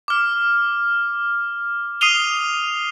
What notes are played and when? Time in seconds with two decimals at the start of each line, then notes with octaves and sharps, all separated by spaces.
0.08 D6 F6
2.01 D#6 C7 D#7 F7 G7